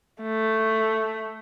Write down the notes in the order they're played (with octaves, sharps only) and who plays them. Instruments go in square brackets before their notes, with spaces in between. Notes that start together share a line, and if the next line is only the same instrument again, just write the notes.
[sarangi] A3